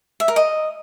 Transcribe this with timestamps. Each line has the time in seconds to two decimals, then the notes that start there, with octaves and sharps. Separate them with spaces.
0.20 E5
0.28 A#4
0.36 D#5